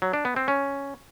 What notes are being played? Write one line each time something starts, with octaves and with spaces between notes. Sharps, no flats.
F#3
D4
B3
C4
C#4